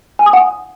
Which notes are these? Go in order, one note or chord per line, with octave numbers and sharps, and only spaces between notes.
G#5
D#6
F#5